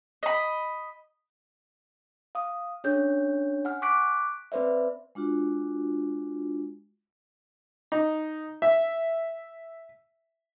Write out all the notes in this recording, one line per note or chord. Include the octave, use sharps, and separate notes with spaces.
D#5 B5
F5 D#6
C#4 D4 G#4 C#5 G6
F#5 G#5 F6
C#6 D6 F#6 B6 D7
C4 B4 C5 D5 E5
G#3 D4 F4 F#4
D#4
E5